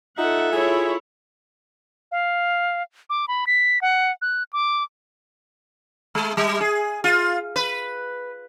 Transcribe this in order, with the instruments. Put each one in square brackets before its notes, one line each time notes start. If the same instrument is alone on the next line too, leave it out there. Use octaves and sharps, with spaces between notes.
[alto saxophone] D#4 [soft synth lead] F4 [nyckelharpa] A4 E5 [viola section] F#5
[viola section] E4 C#5 [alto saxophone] G#4
[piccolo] F5
D6
B5
B6
F#5
F#6
D6
[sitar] G#3
G3
G#4
F4
B4